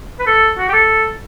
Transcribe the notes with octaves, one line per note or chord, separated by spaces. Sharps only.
B4
A4
F#4
G4
A4